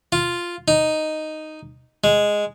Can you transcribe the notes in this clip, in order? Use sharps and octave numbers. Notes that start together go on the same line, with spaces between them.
F4
D#4
G#3